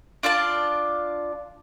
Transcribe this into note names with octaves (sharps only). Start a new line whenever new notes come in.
D4 F4 D5 A5